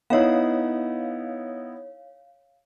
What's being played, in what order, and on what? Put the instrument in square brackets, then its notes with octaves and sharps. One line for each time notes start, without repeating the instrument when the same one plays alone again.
[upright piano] B3 D#4 E4 [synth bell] C#5 F5